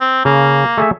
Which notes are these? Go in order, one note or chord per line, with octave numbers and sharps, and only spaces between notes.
C4
C#3 A#3
A3 G#4 E5